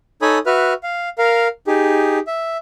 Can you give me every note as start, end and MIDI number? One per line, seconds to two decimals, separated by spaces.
0.22 0.38 63
0.22 0.38 69
0.22 0.38 73
0.22 0.38 80
0.22 0.38 83
0.22 0.38 87
0.46 0.73 66
0.46 0.73 71
0.46 0.73 76
0.46 0.73 89
0.83 1.09 77
1.18 1.48 70
1.18 1.48 77
1.67 2.19 63
1.67 2.19 67
1.67 2.19 68
2.27 2.57 76